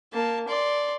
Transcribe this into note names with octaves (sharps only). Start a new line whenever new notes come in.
A#3 A5
D5 C6